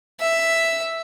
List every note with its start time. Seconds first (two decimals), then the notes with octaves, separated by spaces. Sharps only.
0.21 E5